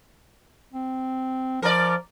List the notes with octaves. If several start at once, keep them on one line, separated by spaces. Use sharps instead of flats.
C4
F3 A#4 D5